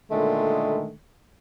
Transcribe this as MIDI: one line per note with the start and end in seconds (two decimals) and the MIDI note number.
0.11 0.93 46
0.11 0.93 50
0.11 0.93 51
0.11 0.93 56
0.11 0.93 57